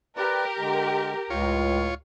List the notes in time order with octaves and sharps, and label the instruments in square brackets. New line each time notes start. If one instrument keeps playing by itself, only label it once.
[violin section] G4 A#4 [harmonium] B4 D5
[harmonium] D3 G#3
[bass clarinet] C#2 [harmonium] A2 [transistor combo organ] F4 C#5